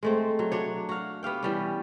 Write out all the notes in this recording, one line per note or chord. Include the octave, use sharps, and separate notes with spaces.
G#3 A3 C4
F#3
F#3 D4 C#5
F#4 F5
B3 G4 F5 G5
E3 G3 C#4